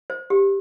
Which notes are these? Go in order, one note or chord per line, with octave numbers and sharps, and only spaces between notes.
C5
G4